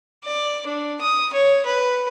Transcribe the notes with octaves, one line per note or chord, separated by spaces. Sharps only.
D5
D4
D#6
C#5
B4